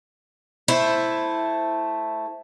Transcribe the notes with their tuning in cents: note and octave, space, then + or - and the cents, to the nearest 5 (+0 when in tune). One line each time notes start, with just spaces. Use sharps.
A3 +0 E4 +0 C5 +0